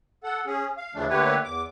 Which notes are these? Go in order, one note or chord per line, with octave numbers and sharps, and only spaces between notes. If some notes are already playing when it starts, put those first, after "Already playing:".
A4 F#5
C#4 G#4
F5
D#2 C#3 E3 F3 A3 D4
D3 A3 A#3 G4 B4 C#5
E2 D6